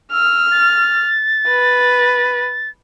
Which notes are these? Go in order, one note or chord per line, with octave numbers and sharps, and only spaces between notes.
E6 F6
A6
B4